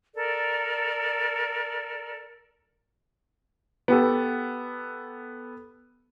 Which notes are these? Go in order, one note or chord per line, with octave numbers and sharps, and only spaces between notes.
A4 A#4 D5
B3 G4 A4